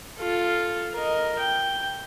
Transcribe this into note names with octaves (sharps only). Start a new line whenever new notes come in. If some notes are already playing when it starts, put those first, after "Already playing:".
F4 A4
A#4 D#5
G5